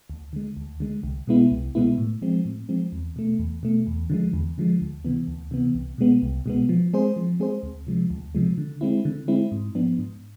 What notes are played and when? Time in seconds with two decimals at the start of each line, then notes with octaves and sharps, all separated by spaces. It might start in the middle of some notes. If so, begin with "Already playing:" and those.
0.10 D2
0.33 D3 G#3
0.57 D2
0.80 D3 G#3
1.03 C2
1.27 B2 G#3 B3 E4
1.51 C2
1.75 B2 G#3 B3 E4
1.98 A2
2.22 F3 G#3 C4
2.45 A2
2.69 F3 G#3 C4
2.92 E2
3.16 B2 A3
3.39 E2
3.63 B2 A3
3.87 E2
4.10 D3 F3 G#3
4.33 E2
4.58 D3 F3 G#3
4.81 D2
5.05 C3 E3 B3
5.28 D2
5.51 C3 E3 B3
5.75 C2
5.98 B2 G#3 B3
6.22 C2
6.46 B2 G#3 B3
6.69 F3
6.93 G#3 C4 G#4 C5
7.16 F3
7.40 G#3 C4 G#4 C5
7.63 D2
7.87 C3 F3 G#3
8.10 D2
8.35 C3 F3 G#3
8.58 D3
8.81 G#3 C4 E4
9.05 D3
9.28 G#3 C4 E4
9.52 G#2
9.75 F3 B3 D4
9.99 G#2